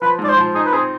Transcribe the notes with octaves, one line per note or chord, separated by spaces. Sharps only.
F3 B4
G#2
D5
C5
F3
D#4 G#4
B4
C4 G#4